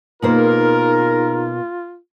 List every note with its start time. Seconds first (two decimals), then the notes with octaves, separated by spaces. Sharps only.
0.22 B2 A#3 D#4 F4 G#4 A#4 C5